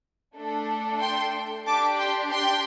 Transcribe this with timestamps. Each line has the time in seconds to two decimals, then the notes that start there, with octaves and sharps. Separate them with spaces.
0.35 A3 D4 A4
1.00 G5 C6
1.66 D4 G4 A5 D6
1.98 G5 C6
2.31 G5 C6